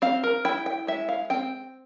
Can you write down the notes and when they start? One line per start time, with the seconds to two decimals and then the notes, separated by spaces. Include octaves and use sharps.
0.02 C4 F5
0.24 A#4
0.45 E4 G5
0.66 G5
0.87 G#3 E5
1.09 F5
1.30 C4 G5